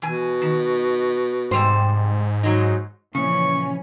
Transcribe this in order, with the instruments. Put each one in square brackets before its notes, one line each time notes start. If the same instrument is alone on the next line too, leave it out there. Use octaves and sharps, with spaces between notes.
[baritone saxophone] B2 [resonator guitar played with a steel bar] E3 G#5
[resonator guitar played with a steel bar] D#3
[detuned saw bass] G#2 [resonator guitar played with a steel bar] C3 G3 C5
[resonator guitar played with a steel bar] F#3 G#3 D#4
[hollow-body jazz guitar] A#2 C#3 [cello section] E3 F3 C#4 [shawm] C#6